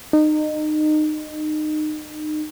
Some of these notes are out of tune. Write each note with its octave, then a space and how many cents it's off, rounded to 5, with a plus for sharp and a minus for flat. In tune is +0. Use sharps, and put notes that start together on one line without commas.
D#4 -30